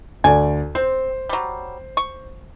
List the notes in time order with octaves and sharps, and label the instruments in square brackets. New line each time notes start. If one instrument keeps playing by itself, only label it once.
[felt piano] D2 D5 [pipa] G#5
[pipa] C4 [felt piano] C5
[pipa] F#3 G3
C#6